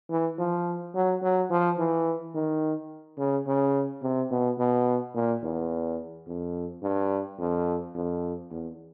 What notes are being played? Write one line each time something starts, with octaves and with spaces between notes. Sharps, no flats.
E3
F3
F#3
F#3
F3
E3
D#3
C#3
C#3
C3
B2
B2
A#2
E2
F2
G2
F2
F2
E2